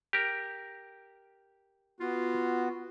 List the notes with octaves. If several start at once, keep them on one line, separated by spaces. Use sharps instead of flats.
G4 A#4
B3 F4 F#4